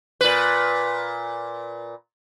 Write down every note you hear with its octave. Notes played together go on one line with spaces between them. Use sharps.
A#2 B4